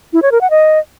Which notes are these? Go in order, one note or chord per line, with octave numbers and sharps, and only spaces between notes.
E4
C#5
A#4
F#5
D#5